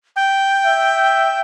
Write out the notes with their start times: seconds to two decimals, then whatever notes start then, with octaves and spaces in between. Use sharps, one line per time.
0.16 G5
0.65 E5